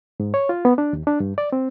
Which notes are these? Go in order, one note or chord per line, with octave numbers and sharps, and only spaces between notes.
G#2
C#5
F4
B3
D4
D#2
D4
G2
D5
C4